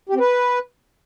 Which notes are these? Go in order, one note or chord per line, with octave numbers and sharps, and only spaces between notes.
G4
C4
B4